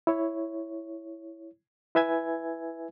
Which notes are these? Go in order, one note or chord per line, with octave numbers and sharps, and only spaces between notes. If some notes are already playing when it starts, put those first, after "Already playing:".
E4 C#5
E4 B4 E5 G#5 G#6